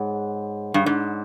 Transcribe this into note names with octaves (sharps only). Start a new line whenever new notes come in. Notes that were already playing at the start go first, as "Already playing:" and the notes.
Already playing: G#2 G#4 C#5 F#5 B5
G2
G#2